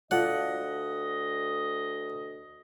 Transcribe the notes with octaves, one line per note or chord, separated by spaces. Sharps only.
D2 F4 A4 D5 D#5 F#5